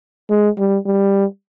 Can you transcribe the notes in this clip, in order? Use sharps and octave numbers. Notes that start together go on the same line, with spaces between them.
G#3
G3
G3